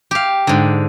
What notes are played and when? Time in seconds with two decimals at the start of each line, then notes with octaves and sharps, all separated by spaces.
0.11 G4 F5
0.47 G#2 D3